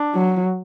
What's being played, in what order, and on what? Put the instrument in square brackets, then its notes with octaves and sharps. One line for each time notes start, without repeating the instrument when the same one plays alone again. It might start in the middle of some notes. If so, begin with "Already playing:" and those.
Already playing: [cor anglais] D4
[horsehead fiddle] F#3